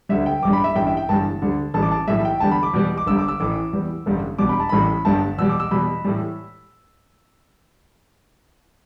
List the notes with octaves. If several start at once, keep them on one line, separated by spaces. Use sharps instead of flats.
D2 D3 G3 E5
G5
A1 G2 G3 D6
B5
E5
A1 G2 E3 G3 G5
E5
G5
G1 G2 E3 G3 A5
D2 D3 G3
A1 A2 E3 G3 A5
D6
A5
B1 A2 E3 G3 E5
G5
E2 D3 G3 A5
B5
D6
E2 B2 G3
D6
G1 G2 G3 E6
D6
E6
A1 A2 E3 D6
E2 E3 G3
A1 G2 D3 G3
E1 E2 B2 G3 D6
B5
A5
A1 A2 E3 G3 B5
G1 G2 G3 A5
E2 B2 G3 E6
D6
E6
E2 B2 G3 B5
A2 E3 G3